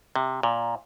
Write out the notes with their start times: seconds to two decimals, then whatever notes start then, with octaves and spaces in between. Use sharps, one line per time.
0.16 C3
0.43 A#2